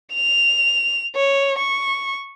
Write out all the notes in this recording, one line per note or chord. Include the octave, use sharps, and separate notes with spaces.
F7
C#5
C#6